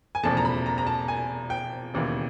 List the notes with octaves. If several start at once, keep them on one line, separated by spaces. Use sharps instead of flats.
G#5
E1 E2 C#3 F3 A3 A5
A#5
B5
A#5
A#5
A5
G#5
G5
E1 D#2 C#3 E3